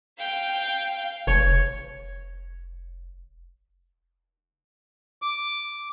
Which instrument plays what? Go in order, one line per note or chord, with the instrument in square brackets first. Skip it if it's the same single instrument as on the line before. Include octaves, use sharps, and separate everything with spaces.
[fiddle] F5 G5
[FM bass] F1 [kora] C#5
[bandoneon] D6